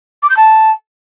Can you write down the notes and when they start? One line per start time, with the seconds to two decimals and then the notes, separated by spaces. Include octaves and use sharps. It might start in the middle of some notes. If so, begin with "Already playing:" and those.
0.23 D6
0.30 G6
0.37 A5